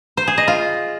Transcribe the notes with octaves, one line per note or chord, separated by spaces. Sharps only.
C5
G#4
D#5
F4